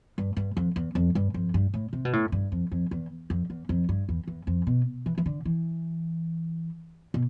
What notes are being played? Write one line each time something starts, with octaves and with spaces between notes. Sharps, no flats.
G2
G2
F2
E2
F2
G2
F2
G2
A2
C3
B2
A2
G2
F2
F2
E2
F2
E2
F2
G2
E2
E2
F2
B2
E3
E3
D3
E3
B2